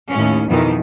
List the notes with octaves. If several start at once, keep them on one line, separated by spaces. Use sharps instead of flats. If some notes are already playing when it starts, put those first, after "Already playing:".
D#2 A2 C#4
F2 B2 D#3 E3